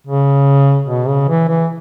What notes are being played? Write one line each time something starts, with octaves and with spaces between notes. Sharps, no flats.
C#3
B2
C#3
E3
E3